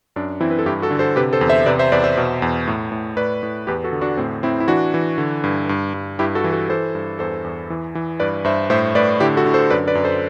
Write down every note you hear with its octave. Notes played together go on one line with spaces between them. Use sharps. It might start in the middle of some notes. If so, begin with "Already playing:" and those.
F#2 D4
E3 C4 E4
B4
A4
G2 E4 G4
F#4 A4
D3
A4 C5
C3 G4 B4
A4 C5
E2
C5 E5
C3 B4 D5
C5 E5
E2 B4 D5
C5 E5
B2
E2
A2
A2
A2 B4 D5
A2
E2 G4 B4
F#4 A4
D3
D4 F#4
A2 C4
A2 C4 E4
E4
E3 D4 F#4
E3
D3
G2
G2
G2
G2 E4 G4
F#4 A4
E3
F#4 A4
E3 A4 C5
G2
E2 A4 C5
E2
E3
E3
G2 B4 D5
G2 C5 E5
A2 C5 E5
A2 B4 D5
D3 E4 G4
F#4 A4
D3
A4 C5
F#2 B4 D5
B4 D5
F#2
A4 C5